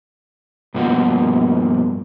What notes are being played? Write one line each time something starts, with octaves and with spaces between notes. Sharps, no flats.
G2 B2 F3 A#3 F#4